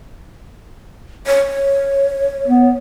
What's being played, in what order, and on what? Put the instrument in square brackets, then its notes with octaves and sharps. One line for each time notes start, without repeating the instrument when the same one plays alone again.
[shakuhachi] C#5
[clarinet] B3